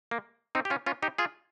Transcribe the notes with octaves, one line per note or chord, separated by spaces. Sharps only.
A#3
C4 D#4
G4
C#4 F4
C#4 F4
D#4 G4
F4 G#4